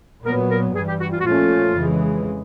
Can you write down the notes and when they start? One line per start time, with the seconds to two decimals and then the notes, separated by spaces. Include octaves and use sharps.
0.25 A#2 F#3 B3 A#4
0.50 A#4
0.75 G2 E3 G3 G#4
0.87 G4
1.00 F#4
1.12 F4
1.19 F#4
1.24 A#2 F3 A3 C#4 F4
1.74 F2 C#3 E3 G#3